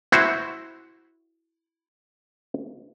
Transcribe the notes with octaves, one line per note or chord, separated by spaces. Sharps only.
E4 F#4 C5